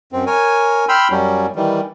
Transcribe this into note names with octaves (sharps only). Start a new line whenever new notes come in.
F#2 C4
A#4 C#5 G#5
G5 B5 C6 E6 F6
F#2 F#3 G3 C#4
D#3 E3 G3